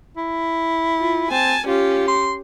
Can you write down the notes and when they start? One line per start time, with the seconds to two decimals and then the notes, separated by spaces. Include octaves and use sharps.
0.17 E4
0.97 F4
1.31 C4 G#5 A5
1.67 C#4 F4 G4
2.08 C6